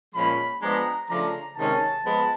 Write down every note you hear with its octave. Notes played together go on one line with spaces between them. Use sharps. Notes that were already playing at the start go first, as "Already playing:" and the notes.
A#2 F3 G#3 C#4 B5
F3 G#3 B3 D4 A#5
C#3 F3 A3 D4 A#5
C3 D#3 G#3 C#4 A5
F3 G#3 B3